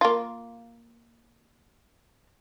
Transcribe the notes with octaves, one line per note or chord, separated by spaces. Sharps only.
A#3 F4